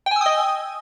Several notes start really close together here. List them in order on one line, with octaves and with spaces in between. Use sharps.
G5 G#5 E6 D#6 D#5